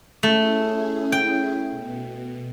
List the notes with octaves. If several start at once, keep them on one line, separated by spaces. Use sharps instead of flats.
A3 C#4 E4 G#4
G5
B2